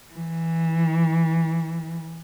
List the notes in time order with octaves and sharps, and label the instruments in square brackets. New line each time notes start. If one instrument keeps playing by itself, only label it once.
[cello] E3